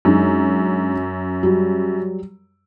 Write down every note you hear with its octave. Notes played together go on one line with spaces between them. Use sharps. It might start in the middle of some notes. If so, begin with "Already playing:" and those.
F#2 G#3 D4 D#4
F#3 G3